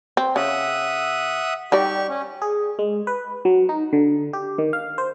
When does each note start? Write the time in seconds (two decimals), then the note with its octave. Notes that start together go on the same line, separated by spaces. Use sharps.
0.17 C4
0.36 C#3 E5 F#5 D#6
1.72 G3 D#4 G4 D5 C#6
2.09 C#4
2.42 G#4
2.79 G#3
3.07 B4
3.45 F#3
3.69 D#4
3.93 D3
4.33 G4
4.58 D#3
4.73 F5
4.98 C5